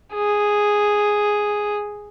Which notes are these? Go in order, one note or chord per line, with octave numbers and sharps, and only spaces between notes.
G#4